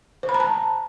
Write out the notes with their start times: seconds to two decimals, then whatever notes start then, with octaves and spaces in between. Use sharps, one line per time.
0.23 C5
0.29 B5
0.34 A#5
0.40 A5